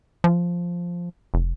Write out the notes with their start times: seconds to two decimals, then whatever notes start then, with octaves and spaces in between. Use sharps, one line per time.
0.24 F3
1.34 F1